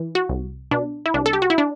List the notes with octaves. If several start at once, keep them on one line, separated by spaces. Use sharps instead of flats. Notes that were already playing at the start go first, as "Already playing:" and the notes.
Already playing: E3
F#4
C2
B2 D4
E4
C2 D4
A4
G4
F#4
E4
D4